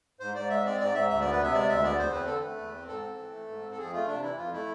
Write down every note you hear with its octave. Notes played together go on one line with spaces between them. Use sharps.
G#2 C5
G#2 D5
G#3 E5
C4 D5
G#2 D5
G#2 E5
D2 E5
B3 D5
B4
C3 E5
G#3 D5
D2 E5
B3 D5
E2 C5
C4 B4
D3 A4
A3 B4
E2
C4
G#2 A4
C4
E3
A3
G#2
C4
A4
F2 G#4
A3 F4
C3 D4
E3 E4
F2 F4
A3 E4